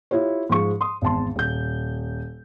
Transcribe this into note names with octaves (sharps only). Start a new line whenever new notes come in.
E4 F4 G4 C#5
G#2 F3 G#3 C#6
C6 D#6
G#1 E2 A5 C6
D#1 G6